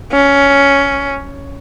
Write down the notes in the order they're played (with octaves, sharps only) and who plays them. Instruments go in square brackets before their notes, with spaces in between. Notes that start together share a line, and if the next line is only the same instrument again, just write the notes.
[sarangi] C#4